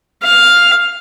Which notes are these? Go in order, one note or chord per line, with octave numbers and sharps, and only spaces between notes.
F5